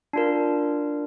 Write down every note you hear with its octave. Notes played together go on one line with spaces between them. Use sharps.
D4 F4 A#4